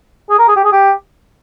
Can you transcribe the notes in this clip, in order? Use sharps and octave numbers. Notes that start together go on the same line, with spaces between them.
G#4
A#4
G#4
G4
G#4
G4